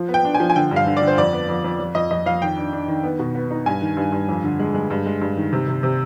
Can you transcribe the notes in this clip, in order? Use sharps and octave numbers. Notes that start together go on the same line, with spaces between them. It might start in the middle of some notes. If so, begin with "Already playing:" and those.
Already playing: F3
B3
G5
D4
G#5
F3
G#5
D3 G5
G2
F5
D3
D5
D3
C5
F2 D5
B3
F2
F2
F2
F2 D#5
F2 D#5
F2 F5
D#3 G5
D4
D4
D#3
B3
B2
B3
D#4
G2 G#5
D#3
G2
G2
F2
D3
G#3
G#3
G2
G#3
G2
D#3
C3
C3
C3